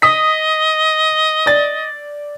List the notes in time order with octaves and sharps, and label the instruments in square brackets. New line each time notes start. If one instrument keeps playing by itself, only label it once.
[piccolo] D#5 [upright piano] D#6 B6
[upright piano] D5 A6